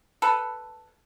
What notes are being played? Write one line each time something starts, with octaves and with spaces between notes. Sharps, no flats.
A4 B4